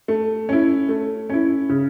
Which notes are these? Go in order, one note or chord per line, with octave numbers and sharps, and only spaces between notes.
A3
C#4 E4
A3
C#4 E4
C#3